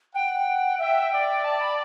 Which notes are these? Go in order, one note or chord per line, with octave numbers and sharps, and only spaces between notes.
F#5 G5
E5 G5
D5
A5
B5